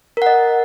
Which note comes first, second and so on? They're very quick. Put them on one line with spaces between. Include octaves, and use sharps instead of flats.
A#4 F#5 D#5